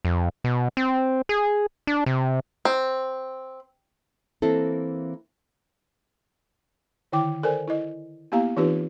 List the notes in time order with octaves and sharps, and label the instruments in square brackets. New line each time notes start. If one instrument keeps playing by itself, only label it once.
[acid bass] F2
B2
C4
G#4
D4
C3
[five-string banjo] C4
[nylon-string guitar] E3 A#3 C4 E4 A4
[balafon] D3 D#3 E4 G5 D6
A4 A#4 C5 D5 G#5
E4 D#5
A#3 B3 E4 G4 F5 A#5
E3 C4 D#4 F4 G4 B4